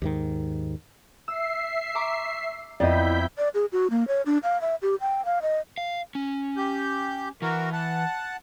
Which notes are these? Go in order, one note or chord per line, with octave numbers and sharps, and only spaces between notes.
D#2 G#2 D#3
E5 E6 C7
A#5 C#6 D6
F2 B3 E4 D5 D#5 G6 B6
D5
G#4
F#4
A#3
C#5
D4
F5
E5
G4
G5
F5
D#5
F5
C#4
G4 G6
E3 F#4 A#4
F#5 A5